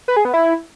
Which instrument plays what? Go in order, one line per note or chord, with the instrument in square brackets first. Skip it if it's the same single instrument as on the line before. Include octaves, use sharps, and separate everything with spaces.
[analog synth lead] B4
G#4
B3
E4